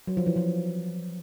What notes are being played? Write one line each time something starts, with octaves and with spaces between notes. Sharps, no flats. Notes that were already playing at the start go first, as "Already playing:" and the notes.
F#3
F3
E3
F3